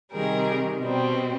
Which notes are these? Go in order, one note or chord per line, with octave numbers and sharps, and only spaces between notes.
C3 D#3 G3 G#4 A#4
B2 G3 C4